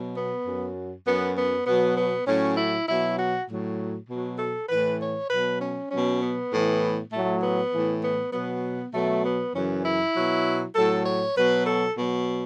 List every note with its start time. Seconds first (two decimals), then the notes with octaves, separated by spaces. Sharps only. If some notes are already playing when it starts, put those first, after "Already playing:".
Already playing: B2 F#3
0.15 B3
0.45 F#2 F#3
1.06 F#2 F#3 B3
1.36 B3
1.66 B2 F#3 B3
1.97 B3
2.26 A2 F#3 C#4
2.57 E4
2.88 B2 F#3 E4
3.18 F#4
3.48 A2 F#3
4.09 B2 F#3
4.39 A4
4.69 A2 E3 B4
4.99 C#5
5.29 B2 F#3 B4
5.60 C#4
5.91 B2 F#3 C#4
6.21 B3
6.51 A2 E3
7.12 A2 F#3 A3
7.43 B3
7.73 A2 E3
8.03 B3
8.32 B2 F#3 B3
8.93 B2 F#3 A3
9.24 B3
9.54 F#2 C#3 E3 C#4
9.84 E4
10.15 B2 F#3
10.75 A2 F#3 A4
11.05 C#5
11.36 B2 F#3 B4
11.67 A4
11.97 B2 F#3